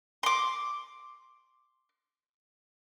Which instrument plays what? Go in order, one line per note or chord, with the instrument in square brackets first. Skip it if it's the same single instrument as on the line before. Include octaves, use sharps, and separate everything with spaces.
[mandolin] C6 D6